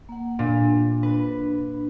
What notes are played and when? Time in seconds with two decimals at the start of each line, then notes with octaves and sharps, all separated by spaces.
0.09 A#3 F#5
0.39 A#2 D4
1.03 B4